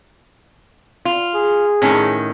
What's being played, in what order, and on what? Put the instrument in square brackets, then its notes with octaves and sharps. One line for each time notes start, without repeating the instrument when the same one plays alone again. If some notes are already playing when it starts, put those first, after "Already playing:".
[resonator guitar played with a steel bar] F4
[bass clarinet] G#4
[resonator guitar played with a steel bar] A2 D#3 C#4